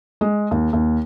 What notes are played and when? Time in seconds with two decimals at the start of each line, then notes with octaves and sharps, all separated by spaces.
0.21 G#3
0.51 D#2
0.73 D#2